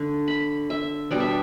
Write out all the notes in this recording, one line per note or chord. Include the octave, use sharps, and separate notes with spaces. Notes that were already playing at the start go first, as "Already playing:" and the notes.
Already playing: D3 A3 D4
B5
E5
B2 G3 B3 D4 D5
E5